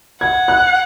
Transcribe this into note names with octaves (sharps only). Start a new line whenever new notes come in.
F#5 G#6
F#6